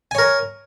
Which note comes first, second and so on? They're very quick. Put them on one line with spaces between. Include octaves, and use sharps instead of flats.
G#5 C#5 A#4